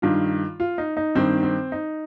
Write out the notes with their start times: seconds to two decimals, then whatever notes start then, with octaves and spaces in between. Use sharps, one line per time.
0.02 G2 D#3 F4
0.60 F4
0.78 D#4
0.97 D#4
1.15 G2 D#3 C4
1.43 C4
1.72 D#4